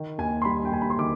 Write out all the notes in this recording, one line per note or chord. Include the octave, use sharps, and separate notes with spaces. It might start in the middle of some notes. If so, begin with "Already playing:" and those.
Already playing: D#3
D#2 G#5
C6
G3 B5
G5
D#2 G#5
B5
C6
D#3 D6